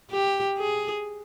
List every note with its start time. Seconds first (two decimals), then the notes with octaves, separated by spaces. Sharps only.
0.11 G4
0.58 G#4